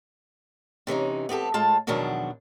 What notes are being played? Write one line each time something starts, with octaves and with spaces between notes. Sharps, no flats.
C3 E3 C#4 D#4
B3 C4 G4 A4
A2 G#3 F4 A5
E2 B2 D#3 F3 F#3 D4